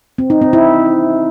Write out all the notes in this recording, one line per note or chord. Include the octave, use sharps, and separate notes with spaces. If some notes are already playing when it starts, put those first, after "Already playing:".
C4
D#4
C4
E4